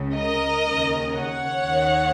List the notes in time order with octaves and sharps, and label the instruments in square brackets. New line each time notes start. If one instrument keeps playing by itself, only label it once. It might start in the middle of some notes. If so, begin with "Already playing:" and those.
Already playing: [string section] C#2 C#3
A#4 D#5
D#2 C#3
C#5 F#5
D#2 D#3